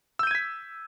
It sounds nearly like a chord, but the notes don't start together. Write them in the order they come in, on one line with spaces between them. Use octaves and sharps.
E6 G6 D#7 G#6 B6